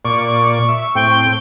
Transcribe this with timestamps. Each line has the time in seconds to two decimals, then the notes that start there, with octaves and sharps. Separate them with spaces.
0.05 A#2 D5 C#6
0.68 E5
0.95 A2 C4 G5